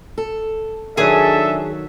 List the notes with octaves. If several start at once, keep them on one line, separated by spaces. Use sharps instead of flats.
A4
D#3 F#3 D4 G#4 A4 E5